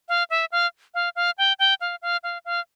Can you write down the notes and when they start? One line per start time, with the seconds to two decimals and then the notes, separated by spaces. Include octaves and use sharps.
0.09 F5
0.30 E5
0.52 F5
0.94 F5
1.16 F5
1.38 G5
1.59 G5
1.81 F5
2.02 F5
2.23 F5
2.45 F5